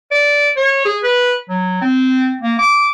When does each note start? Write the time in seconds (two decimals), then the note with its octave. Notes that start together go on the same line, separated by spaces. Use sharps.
0.12 D5
0.57 C#5
0.85 G#4
1.04 B4
1.49 F#3
1.82 C4
2.42 A#3
2.59 D6